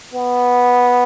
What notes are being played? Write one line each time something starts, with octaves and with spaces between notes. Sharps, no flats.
B3